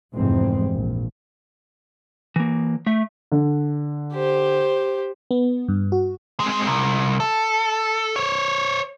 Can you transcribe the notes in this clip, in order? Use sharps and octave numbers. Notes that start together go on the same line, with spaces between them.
F1 E2 G#2 G#3 C4
A#1
E3 A#3
A3 E5
D3
G4 C5
B3
G2
F#4
G#3 C4
C2
A4
C5 C#5